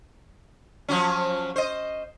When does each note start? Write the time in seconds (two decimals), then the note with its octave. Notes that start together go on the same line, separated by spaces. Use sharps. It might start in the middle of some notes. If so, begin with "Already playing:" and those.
0.89 F3 F#3 C#4
1.56 C5 D#5